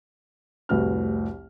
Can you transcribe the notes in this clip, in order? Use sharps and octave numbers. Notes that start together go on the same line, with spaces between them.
F1 C2 A2 F#4 B4 F6